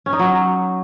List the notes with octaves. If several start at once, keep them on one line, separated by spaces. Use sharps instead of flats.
C#4
D#4
F#3